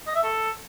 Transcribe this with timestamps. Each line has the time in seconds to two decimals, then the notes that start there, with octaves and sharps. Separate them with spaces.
0.07 D#5
0.15 E5
0.23 A4